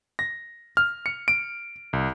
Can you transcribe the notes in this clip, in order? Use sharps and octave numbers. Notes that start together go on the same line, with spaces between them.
A#6
F6
C#7
D7
C2